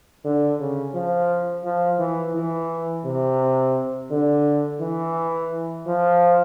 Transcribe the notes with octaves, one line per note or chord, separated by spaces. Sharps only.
D3
C#3
F3
F3
E3
E3
C3
D3
E3
F3